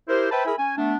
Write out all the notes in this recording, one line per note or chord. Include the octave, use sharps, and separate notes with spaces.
E4 G4 A#4 C5
B4 C5 E5 G5 A5 B5
E4 G#4 A#4 E5 G#5 B5
C#4 G#5
A3 B3 D4